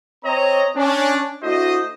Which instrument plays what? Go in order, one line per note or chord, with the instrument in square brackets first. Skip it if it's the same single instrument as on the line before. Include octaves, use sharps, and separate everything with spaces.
[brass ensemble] C4 C#5 D#5 A#5
C#4 D4
A3 D4 E4 F#4 C5 D#5